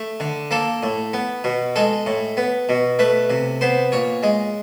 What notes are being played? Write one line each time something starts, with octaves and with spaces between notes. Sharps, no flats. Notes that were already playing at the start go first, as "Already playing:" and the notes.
Already playing: A3
D3
A#3 A4
A2
B3
B2
G#3 A4
A2
B3
B2
A3 B4
C3
B3 C5
A#2 C#5
G#3